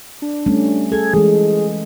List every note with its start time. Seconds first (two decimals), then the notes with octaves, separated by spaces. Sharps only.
0.22 D4
0.46 G3 A3 C#4
0.92 G#4 A4 G#6
1.14 E3 G#3 G#4